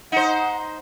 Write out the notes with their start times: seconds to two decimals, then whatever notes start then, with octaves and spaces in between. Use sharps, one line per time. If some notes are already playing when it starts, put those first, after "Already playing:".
0.12 D#4 C5 F#5